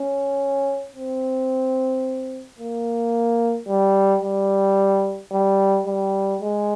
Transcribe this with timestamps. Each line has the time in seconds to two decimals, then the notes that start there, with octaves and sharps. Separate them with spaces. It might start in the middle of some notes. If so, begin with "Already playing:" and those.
Already playing: C#4
0.96 C4
2.59 A#3
3.68 G3
4.22 G3
5.32 G3
5.87 G3
6.41 G#3